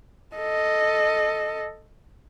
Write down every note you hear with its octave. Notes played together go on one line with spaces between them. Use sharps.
A4 D#5